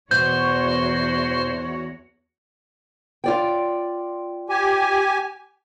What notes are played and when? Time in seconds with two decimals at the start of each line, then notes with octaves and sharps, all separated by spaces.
0.11 E2 B2 F#4 C5 C#5 G6
3.24 F4 D5 G5
4.49 G4 G#5